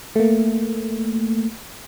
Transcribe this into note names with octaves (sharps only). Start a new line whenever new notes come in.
A3 A#3